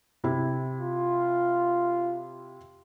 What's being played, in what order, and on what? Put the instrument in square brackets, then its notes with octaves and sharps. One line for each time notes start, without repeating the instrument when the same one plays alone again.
[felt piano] C3 E4
[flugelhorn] F4